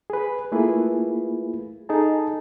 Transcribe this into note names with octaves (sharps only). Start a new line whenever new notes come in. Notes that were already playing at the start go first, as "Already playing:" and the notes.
G#4 B4
A3 A#3 E4 F4 G#4 B4
D#4 G#4 A4 A5